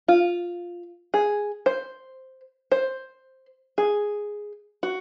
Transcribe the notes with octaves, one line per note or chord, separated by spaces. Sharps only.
F4
G#4
C5
C5
G#4
F#4